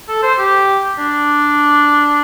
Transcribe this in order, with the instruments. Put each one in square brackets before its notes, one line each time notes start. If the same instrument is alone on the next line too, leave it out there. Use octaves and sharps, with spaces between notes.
[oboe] A4
C5
G4
D4